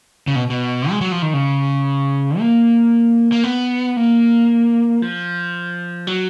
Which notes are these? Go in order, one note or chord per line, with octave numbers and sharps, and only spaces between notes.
C#3
B2
B2
G#3
F#3
F3
D#3
C#3
A#3
A#3
B3
A#3
F3
F#3